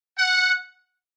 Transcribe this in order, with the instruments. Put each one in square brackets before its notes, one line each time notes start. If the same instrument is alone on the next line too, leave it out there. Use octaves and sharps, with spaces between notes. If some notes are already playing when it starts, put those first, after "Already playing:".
[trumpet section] F#5